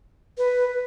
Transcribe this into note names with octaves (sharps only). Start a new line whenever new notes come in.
B4